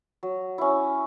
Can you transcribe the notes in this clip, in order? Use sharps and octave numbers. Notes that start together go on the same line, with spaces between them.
F#3
C#4 E4